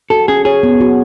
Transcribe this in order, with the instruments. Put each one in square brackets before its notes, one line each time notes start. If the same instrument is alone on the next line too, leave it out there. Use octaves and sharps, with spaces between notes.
[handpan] F#4 [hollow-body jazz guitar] A4
[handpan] C#4 [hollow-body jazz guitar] G#4
[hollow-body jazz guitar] G#4 [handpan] C#5
[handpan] B3
F#4